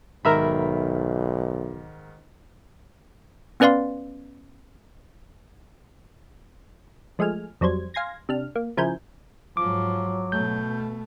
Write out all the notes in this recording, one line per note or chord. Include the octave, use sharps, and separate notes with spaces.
B1 G#2 D#3 A#4 E5 B5
B3 C#4 B4 D5 F5 C6
F3 G#3 A3 G#5 F6
F2 F#3 G3 C5 G#6
F5 G#5 C6 G#6 A#6
C3 D4 F6
A#3
C#3 F3 E4 A#4 G#5 G6
G#2 F3 F#3 D6
B2 A3 G6